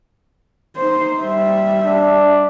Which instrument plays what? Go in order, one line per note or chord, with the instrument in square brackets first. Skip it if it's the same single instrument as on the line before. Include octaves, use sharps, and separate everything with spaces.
[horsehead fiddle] D#4 C5
G3 E5
[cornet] D4